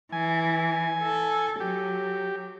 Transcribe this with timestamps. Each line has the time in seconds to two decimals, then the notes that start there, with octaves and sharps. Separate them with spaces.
0.12 E3 G#5
1.02 A4
1.60 F#3 G4